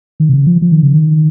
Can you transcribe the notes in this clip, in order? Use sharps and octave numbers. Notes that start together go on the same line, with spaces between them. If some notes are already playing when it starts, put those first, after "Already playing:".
D#3
C3
C#3
F3
F3
D#3
C#3
D#3